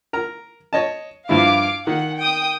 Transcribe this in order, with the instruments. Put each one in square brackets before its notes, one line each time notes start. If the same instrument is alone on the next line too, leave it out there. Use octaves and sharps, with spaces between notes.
[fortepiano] A#4 A#5
C#5 D#5 A5
[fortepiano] G2 F3 E4 [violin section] F5 D6
[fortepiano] D#3 [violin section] F#5
[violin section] G5 D#6